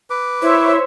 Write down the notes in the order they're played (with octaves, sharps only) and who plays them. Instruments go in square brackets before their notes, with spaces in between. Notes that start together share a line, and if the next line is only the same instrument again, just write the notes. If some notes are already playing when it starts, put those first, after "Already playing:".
[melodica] B4 D6
[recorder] E4 [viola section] C5 C#5 E5